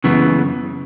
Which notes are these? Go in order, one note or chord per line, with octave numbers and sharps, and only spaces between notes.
F#2 C#3 E3 B3